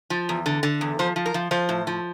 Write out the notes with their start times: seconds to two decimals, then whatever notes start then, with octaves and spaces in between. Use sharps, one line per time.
0.10 F3
0.29 E2
0.46 D3
0.63 D3
0.81 E2
0.99 F3 C5
1.16 F3
1.26 A#4
1.34 F3
1.51 F3 C5
1.69 A2
1.87 F3